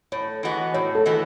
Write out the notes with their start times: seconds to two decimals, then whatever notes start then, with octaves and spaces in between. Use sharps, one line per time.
0.12 A2 C#5
0.43 E3 G#3 B3 F#4
0.74 A2 C#5
0.95 A4
1.05 E3 G#3 B3 F#4